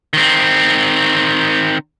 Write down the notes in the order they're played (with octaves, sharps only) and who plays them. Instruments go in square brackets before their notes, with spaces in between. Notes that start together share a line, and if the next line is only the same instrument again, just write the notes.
[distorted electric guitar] D#3 C4